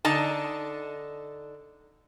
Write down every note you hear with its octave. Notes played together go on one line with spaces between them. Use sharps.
D3 D#4 A5